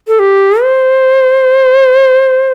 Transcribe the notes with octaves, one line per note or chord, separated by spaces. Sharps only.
A4
G4
C5